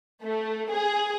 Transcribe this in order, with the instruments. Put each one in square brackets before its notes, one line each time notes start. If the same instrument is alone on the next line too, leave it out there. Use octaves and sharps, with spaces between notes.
[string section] A3
G#4